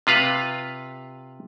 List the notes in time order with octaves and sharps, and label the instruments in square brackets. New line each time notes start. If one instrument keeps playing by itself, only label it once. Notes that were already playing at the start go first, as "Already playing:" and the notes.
[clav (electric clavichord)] C3 F4 B4 F5